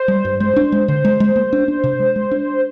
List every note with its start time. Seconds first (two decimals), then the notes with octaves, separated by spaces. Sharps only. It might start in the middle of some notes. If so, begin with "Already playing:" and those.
Already playing: C5
0.08 G3
0.25 G2
0.40 G#3 C5
0.56 D4
0.72 G#3
0.88 D3 C5
1.05 G#3
1.20 G#3
1.36 A#3
1.53 D4
1.68 D4
1.84 C3
2.00 G#3
2.16 G#3
2.31 D4